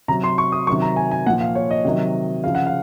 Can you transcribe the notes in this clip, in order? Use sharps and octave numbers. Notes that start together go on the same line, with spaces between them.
C3 F#3 A#5
C6
C#6
D#6
C3 D#3 F#3 C#6
A#5
G#5
G#5
A#2 F3 F#5
F5
C#5
D#5
C3 D#3 F#3
C#3 F3 F5
F#5
F5